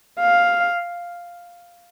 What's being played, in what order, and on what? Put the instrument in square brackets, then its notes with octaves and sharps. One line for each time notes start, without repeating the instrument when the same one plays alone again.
[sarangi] F5